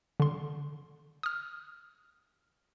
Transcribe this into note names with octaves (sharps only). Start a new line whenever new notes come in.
D3 C6
D#6 F6